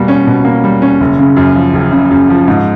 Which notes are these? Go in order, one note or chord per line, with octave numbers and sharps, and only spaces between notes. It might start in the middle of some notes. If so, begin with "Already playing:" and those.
Already playing: B2 G3 A#3
C#4
B2
A#3
G3
C#4
F#1
C#3
F#2
F3
F#1
C#3
F#2
F3
G#2